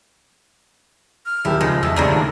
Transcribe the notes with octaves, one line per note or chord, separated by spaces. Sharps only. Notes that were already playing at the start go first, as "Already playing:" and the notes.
F6
D#1 E4 G4
C#2 F3 G#3 D#4
E2 A4 D#5 E5 E6
C#2 A2 C3 A#3 G#4 A#4 D5
D#2 D3